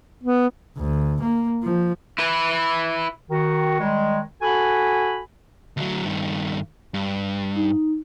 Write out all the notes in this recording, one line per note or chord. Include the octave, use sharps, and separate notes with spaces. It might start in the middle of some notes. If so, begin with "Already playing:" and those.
B3
D2
A#3
F3
E4 B4
D#3 F#4
D#3 G3 G#3
F#4 A4 G#5 B5
D2 F#3
G2 D#3
G2
D#4